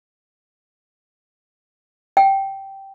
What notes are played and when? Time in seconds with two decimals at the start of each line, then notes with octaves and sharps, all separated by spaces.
2.17 G5